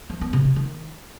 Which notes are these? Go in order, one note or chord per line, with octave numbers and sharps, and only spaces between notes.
F3
B3
C3
C3
D#3